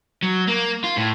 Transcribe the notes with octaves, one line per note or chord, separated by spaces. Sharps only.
F#3
A#3
F4
A2